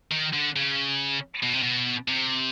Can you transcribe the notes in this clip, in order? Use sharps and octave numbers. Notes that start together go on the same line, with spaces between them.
D#3
D3
C#3
B2
C3
B2
C3